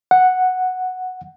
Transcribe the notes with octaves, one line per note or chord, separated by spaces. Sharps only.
F#5